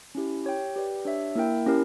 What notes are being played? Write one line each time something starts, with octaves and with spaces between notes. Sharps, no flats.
C#4 E4 G4
G4 C#5 G5
G4 B4 D5 G5
D4 G4 C#5 E5
A#3 E4 A#4 E5 G5
C#4 E4 G4 A#4